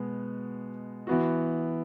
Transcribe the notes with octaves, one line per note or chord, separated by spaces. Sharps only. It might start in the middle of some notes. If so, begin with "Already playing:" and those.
Already playing: B2 G#3 B3
E3 B3 F#4